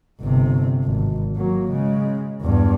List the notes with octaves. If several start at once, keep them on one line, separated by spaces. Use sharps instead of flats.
G1 C3
G#1
F#3 A#3
C#3 G#3
E2 G2